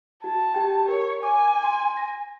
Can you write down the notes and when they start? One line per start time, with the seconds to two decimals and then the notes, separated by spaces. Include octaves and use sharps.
0.24 F#4 A5
0.54 G4 G5
0.88 A#4 C#5
1.23 G#5 D6
1.64 C6
1.97 A#6